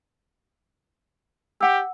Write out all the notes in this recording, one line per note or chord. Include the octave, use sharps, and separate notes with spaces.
G4 F#5 E6